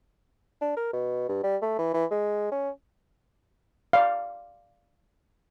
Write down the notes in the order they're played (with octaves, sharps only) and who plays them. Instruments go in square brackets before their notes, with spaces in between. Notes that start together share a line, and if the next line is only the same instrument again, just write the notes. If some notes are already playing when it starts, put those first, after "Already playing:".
[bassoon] D4
A#4
B2
G2
G3
A3
E3
E3
G#3
C#4
[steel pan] D5 F5